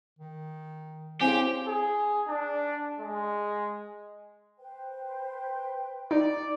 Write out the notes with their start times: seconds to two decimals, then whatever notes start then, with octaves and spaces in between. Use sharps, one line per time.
0.19 D#3
1.21 C4 E4 G4 G#4 C5 C#5 F5 G#5
1.67 G#4
2.27 D4
3.00 G#3
4.59 B4 C5 G5
6.11 D#4 D5